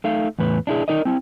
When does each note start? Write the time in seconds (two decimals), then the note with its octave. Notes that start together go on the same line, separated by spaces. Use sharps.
0.04 A3 D#4 F5
0.39 E2 A2 B4
0.67 D4 E4 G#4
0.88 D#4 A#4 D5 D#5
1.05 C4 E4